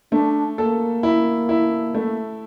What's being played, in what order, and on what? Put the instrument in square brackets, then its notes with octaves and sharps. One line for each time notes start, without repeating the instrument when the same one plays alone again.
[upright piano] A3 [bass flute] D4
[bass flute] A#3 [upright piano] A4
[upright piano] E4
E4
A3